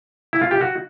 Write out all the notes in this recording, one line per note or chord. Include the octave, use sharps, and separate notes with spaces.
E4
F4
G4
F#4